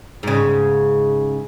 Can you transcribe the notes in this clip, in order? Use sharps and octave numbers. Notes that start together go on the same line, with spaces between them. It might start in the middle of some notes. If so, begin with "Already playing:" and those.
G#2 C#3